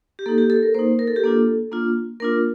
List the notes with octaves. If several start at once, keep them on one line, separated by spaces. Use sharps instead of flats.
G4
A#3 D#4 A4
G4
A4
A#4
A#3 D#4 C5
A#4
A4
G4
A#3 D4 F4 A4
A#3 D4 F4
A#3 D4 F4 A#4